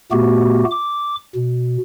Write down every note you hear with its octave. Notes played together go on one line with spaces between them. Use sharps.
A#2 A3 B3 F#4 G4
D6
B2